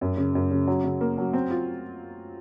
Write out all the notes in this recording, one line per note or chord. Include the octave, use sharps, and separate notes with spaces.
F#2
C#3
F#2
C#3
F#3
C#3
A#3
F#3
C4
F4